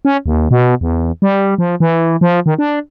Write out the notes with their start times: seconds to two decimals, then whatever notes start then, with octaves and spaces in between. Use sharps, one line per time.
0.05 C#4
0.26 D#2
0.51 B2
0.81 E2
1.22 G3
1.58 F3
1.80 E3
2.21 F3
2.46 D#3
2.59 D4